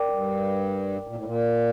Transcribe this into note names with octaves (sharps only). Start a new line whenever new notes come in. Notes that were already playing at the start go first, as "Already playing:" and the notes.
Already playing: A#4 D5 G5 D6
G2
A#2
A2
A#2